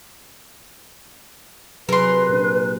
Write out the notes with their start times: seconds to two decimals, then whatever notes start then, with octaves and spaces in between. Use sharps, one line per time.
1.89 C3 F#3 G#4 A#4 B4 C6
2.29 A#2 D4